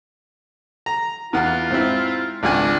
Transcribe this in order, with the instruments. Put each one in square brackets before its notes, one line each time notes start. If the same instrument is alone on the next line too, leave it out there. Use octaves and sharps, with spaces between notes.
[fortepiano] A#5
[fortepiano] E2 B4 F#5 [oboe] F4
[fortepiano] G#2 C4 E4
[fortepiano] G#1 C#2 G#5 [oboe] D4